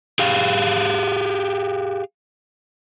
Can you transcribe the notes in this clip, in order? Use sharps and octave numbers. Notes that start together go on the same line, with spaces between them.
G4 G#4 F5